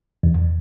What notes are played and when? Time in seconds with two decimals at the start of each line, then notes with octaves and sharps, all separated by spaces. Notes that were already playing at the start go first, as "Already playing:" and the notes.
0.23 E2